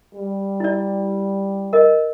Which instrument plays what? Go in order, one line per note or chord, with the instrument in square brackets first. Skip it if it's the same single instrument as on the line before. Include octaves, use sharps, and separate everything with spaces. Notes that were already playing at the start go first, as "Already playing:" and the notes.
[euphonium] G3
[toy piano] E4 D5
A#4 D#5